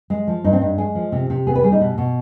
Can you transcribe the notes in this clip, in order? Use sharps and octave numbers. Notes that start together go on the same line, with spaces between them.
G#3
F3
G2 D#4
C4
G2 D#4
G#3 G#4
F3
C3
C3
B3 G#4
B4
G3 G#4
D#4
B2
B2